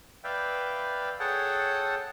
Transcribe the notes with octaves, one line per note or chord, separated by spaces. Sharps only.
B4 D5 E5 F5 G5
G#4 A4 C#5 F#5 G5 A5